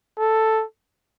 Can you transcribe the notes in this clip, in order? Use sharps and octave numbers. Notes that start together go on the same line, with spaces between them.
A4